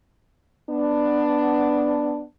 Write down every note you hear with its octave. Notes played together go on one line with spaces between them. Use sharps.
B3 D4